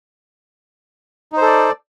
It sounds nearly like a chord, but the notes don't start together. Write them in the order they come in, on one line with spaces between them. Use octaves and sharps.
D#4 C5 A4 D5